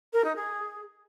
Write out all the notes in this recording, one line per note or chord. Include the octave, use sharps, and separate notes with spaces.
A#4
D#4
G#4